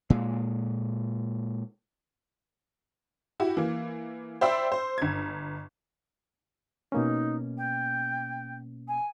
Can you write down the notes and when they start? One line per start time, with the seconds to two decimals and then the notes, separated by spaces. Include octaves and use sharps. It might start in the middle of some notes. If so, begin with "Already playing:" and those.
0.10 A#2 G#3
3.40 E4 F#4 G4
3.57 E3 A#3
4.41 C5 D5 E5 G5 B5 E6
4.72 C5
4.98 G1 G#6
6.92 B2 A#3 C#4 D#4
7.58 G5
8.88 G#5